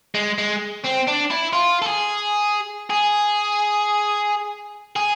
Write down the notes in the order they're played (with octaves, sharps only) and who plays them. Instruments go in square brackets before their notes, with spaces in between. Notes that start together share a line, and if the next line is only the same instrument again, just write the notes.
[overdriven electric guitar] G#3
G#3
C4
D4
E4
F4
A4
G#4
G#4
G#4